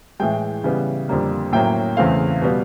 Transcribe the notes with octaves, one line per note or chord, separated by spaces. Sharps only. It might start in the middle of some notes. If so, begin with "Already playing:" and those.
A2 E3 G#3 G5
C#3 E3 G3 B3
F2 D3 G3 A#3
A2 F#3 A#3 C#4 G5
E2 C#3 E3 A3 C4 F5
B2 G3 B3